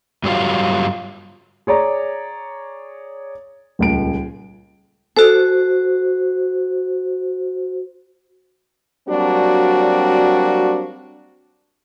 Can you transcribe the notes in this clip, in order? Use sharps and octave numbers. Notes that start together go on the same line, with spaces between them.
G2 F#3 G3 F4
G#4 C#5 D5 A#5
D#1 C#2 D7
F#4 A4 C5
F#3 G3 A#3 C4 D4 F#4